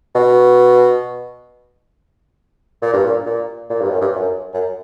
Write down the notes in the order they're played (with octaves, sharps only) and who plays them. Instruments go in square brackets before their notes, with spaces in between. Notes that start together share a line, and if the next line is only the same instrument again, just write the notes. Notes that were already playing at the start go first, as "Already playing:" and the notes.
[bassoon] B2
A#2
G2
A#2
A#2
A#2
G2
F#2
G2
F#2
F#2